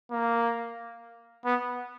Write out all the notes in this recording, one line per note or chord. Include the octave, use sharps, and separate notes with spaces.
A#3
B3